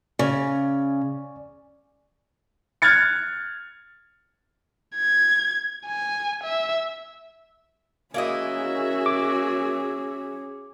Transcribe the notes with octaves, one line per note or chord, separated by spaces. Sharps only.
C#3 D5 G#5 C#6
F6 F#6 G#6 A6 C#7
G#6
G#5
E5
A#3 C#4 E4 F#4 G#4 D#5 E5
D6